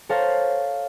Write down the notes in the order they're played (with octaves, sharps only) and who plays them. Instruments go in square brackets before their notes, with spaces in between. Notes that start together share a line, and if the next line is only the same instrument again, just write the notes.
[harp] A4 C5 C#5 F5 A5 A#5